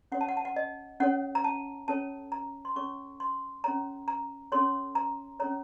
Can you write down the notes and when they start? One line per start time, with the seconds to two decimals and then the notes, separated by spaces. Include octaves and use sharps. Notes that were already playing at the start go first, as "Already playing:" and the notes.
0.12 C#4 A4 C#5 F#5
0.21 A5
0.29 F#5
0.37 A5
0.45 F#5
0.56 D#5
1.00 C#4 A4 C#5 F#5
1.35 A#5
1.44 A5
1.88 C#4 A4 C#5 A5
2.32 A#5
2.65 C6
2.76 C#4 A4 C#5 C#6
3.20 C6
3.64 C#4 A4 C#5 A#5
4.08 A#5
4.52 C#4 A4 C#5 C6
4.95 A#5
5.40 C#4 A4 C#5 A#5